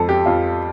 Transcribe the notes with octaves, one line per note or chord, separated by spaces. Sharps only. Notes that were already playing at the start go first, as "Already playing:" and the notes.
Already playing: F2 F3 A4
G4
F2 F4